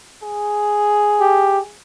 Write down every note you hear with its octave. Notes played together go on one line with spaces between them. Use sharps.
G#4
G4